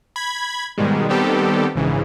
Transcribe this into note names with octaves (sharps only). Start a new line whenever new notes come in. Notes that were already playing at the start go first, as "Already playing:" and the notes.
B5 G#6
G#2 B2 D#3 G3 G#3
D#3 G3 B3 C4 G4 A4
A#1 G#2 C#3 E3